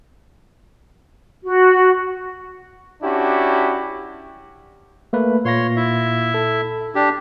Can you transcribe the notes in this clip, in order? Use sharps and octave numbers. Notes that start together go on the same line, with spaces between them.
F#4
C#4 D4 E4 F#4 G4
A3 A#3 B4
A#2 C#5 F5 C6 A#6
E4 E5
A4
D4 G4